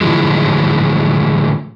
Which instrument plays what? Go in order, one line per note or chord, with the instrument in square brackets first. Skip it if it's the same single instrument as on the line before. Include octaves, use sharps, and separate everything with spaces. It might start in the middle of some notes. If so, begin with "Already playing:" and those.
[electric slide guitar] A2 D3 E3 F3 G#3